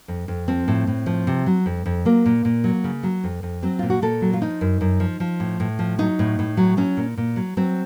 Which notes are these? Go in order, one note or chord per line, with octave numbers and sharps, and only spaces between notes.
F2
F2
F3 C4
A2
A2
F3
C3
F#3
F2
F2
F#3 A#3
A#2
A#2
F#3
C#3
F#3
F2
F2
F#3 C4
A#2 F4
F#4
A#2 A4
F#3
F4
F3 D#4
F#2
F#2
F3
F3
A2
A2
F3
F#3 D#4
A2
A2
F#3
F#3 C#4
A#2
A#2
F#3
F#3 C4